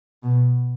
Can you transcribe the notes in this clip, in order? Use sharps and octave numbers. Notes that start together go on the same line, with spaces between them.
B2